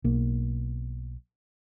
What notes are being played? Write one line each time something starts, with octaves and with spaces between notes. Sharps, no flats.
B1 A#3